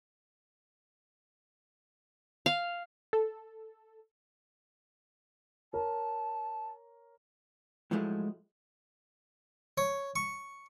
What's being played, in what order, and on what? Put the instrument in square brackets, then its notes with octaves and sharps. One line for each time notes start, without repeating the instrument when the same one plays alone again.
[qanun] F5
[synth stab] A4
[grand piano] A#4 C#5 [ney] A5
[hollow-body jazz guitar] A2 F3 F#3 G#3 A3 E4
[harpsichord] C#5
C#6